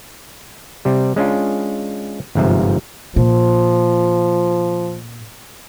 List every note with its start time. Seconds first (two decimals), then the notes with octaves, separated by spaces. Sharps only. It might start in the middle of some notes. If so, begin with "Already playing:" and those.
0.85 C3 G3
1.16 G#3 C#4 D4 F4
2.35 G1 G#2 C3 F3 E5
3.16 A#2 F3